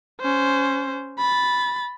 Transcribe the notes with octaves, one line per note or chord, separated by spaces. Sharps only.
C#4 C5
B5 A6